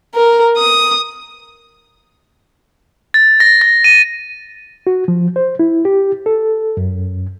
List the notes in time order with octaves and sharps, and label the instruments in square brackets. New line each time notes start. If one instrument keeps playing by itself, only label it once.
[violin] A#4
D#6
[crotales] A6
A#6
A#6
D#7
[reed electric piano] F#4
F3
C5
E4
G4
A4
F#2